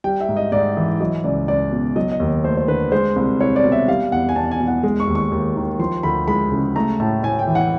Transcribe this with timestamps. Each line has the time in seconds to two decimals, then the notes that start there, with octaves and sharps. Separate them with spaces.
0.04 G3 G5
0.21 E5
0.29 G#2
0.37 D#5
0.52 G#2 D5
0.77 E3
1.00 F#3 D#5
1.24 C#2 D5
1.48 C#2 D5
1.72 B2
1.96 F#3 D#5
2.12 D#5
2.20 D#2
2.44 A3 C5
2.57 C5
2.68 D3 B4
2.92 G#3 C5
3.16 C2
3.40 C2 C#5
3.56 D5
3.64 B2
3.72 E5
3.88 G3 F5
4.12 E2 F#5
4.29 G#5
4.36 E2 A5
4.51 G#5
4.60 B2
4.67 F#5
4.83 G#3
5.00 C#6
5.07 D#2
5.15 C#6
5.32 D#2
5.56 D#3
5.79 F3 C6
6.03 D2 B5
6.28 G#3 B5
6.52 C#3
6.76 A3 A#5
7.00 A2 A5
7.23 A2 G#5
7.39 G5
7.47 E3
7.55 F#5